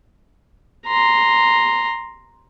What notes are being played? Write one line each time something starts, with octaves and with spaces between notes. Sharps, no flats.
A#5 C6